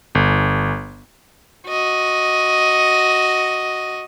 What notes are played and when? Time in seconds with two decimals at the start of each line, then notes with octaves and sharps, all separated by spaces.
0.15 G1
1.68 F#4 D#5